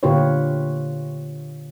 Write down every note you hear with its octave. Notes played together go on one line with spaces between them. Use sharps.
A#2 D3 F4 G4 B4 C#5